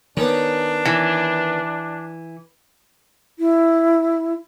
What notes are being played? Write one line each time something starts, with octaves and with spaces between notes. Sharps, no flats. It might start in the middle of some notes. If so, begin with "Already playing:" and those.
D#3 B3 C#4 D4
E3
E4